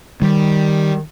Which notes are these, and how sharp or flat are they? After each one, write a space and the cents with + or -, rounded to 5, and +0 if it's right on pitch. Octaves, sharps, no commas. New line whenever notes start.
D#3 +0 G3 +0